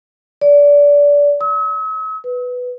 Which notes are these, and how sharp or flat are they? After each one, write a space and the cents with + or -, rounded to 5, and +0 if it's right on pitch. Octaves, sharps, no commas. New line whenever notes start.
D5 -25
E6 -45
B4 +5